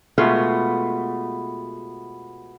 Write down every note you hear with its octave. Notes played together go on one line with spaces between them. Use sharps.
B2 G#3 A3 B3 F4